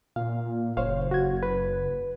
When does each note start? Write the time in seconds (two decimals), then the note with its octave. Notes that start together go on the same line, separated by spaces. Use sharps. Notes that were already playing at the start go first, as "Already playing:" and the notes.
0.16 A#2 F5
0.77 F#1 C5 C#5 F5
1.11 F#4 G#6
1.43 B4